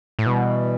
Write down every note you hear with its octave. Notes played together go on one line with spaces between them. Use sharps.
A2
B2 E3 G3